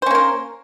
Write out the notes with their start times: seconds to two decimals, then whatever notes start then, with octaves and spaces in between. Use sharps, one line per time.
0.02 C5
0.06 C#4
0.11 A#3
0.15 A#4